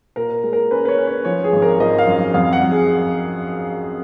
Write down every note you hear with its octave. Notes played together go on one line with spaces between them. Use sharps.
A#2 A#4
G#3
A#4
C#4 B4
B4
C#5
C#4
C#5
F3 C#5
G#4
G#1
A#4
F3 D#5
F5
F#2
F2 F5
F#5
F2
G#4